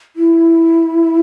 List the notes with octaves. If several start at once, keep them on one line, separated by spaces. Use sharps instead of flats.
E4